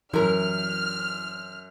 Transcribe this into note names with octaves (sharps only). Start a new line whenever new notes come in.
F#2 E3 E4 A#4 F6